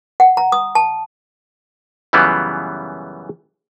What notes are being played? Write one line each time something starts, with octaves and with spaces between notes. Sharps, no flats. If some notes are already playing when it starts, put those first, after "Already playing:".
F#5
A#5
D#6
A5
F#2 C#3 E3 G3 B3 F4